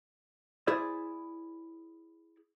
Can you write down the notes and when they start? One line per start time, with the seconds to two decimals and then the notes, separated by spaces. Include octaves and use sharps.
0.67 E4 G#4 C5 D5